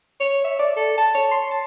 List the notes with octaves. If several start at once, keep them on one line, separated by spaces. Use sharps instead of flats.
C#5
E5
D5
A4
A5
C#5
C6
A5